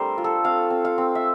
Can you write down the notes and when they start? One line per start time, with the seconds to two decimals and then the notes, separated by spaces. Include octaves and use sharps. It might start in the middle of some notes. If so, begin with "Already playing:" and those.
Already playing: G3 A3 C4 D4 A#4 C5
0.18 F4
0.24 A4
0.44 C4 F5
0.70 C4
0.85 F5
0.98 C4
1.15 E5